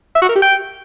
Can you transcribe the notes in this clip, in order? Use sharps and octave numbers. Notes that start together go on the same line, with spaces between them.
E5
F#4
A#4
G4
G5